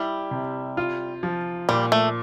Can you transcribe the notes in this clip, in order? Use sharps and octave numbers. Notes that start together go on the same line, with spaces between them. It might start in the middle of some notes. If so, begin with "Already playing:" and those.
Already playing: G3 E4
C3
F4
F3
A#2 G3
A3